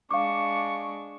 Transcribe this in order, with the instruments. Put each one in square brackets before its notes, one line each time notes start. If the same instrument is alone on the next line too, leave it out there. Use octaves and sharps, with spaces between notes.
[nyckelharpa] G#3 D4 [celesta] F5 D6 [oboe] C#6